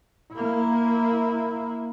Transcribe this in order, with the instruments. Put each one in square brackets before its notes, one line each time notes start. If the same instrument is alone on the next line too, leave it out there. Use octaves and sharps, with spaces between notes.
[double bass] A#3 E4